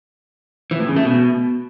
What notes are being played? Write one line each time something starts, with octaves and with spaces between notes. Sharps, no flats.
E3
A2
C#3
A3
B2